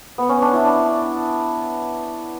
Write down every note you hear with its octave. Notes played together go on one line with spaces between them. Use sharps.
B3
C#4
D4
E4
D4